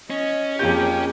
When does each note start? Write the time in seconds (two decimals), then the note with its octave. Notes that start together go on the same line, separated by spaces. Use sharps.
0.10 C#4 D#5
0.59 F2 A#3 F4 G4 G#4 G5 G6